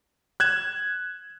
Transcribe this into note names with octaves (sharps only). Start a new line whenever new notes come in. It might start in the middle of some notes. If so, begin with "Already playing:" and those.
F#6 G#6 E7